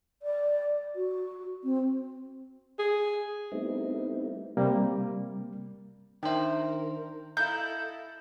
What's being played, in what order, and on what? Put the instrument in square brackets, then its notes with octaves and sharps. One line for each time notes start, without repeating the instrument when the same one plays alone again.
[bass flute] D5
F#4
C4
[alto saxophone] G#4
[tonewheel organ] G3 A3 B3 C4 D#4 E4
[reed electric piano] C3 G3 A#3
[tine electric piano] D#3 D4 C5 [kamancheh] A#4 [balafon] E5 G5
[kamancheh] E4 A4 [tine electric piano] D#5 [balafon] F5 A#5 [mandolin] G6